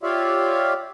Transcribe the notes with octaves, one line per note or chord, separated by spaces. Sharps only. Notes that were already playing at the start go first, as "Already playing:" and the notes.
F4 G4 C#5 D5 E5 F5